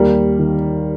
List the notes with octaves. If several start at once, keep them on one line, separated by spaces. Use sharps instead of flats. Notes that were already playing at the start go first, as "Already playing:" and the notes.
Already playing: D#2 G3 A#3
D#3